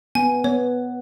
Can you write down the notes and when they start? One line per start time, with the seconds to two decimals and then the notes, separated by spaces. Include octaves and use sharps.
0.15 B3 G#5
0.44 B3 C#5